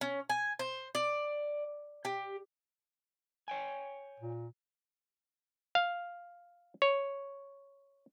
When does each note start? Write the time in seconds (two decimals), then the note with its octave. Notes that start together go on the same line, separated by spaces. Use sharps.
0.01 C#4
0.29 G#5
0.59 C5
0.95 D5
2.05 G4
3.48 C#5 G5 G#5
4.20 A#2
5.75 F5
6.82 C#5